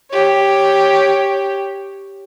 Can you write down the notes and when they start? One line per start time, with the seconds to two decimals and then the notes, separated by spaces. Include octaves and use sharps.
0.11 G4 C#5